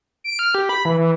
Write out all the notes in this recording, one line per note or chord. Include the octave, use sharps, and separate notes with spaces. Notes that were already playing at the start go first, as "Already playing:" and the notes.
D7
F6
G4
B5
E3
E3